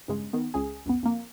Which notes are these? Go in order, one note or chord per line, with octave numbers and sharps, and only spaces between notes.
E2 G2 C#3 G#3
D#3 B3
C#2 C#3 G#4
C#2 F#2 B3
F2 A#3